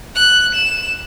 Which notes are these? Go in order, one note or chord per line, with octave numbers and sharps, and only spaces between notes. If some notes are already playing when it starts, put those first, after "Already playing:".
F#6
E7